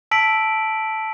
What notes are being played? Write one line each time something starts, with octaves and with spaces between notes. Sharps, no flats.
A5 E6 B6 D7 F#7